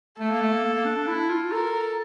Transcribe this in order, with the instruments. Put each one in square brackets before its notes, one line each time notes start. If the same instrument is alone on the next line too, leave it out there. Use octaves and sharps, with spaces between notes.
[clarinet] A3 [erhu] A4
[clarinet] A#3
A3
A#3
A#3
A#3
D4
D4
E4
F4
[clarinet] A4 [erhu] A#4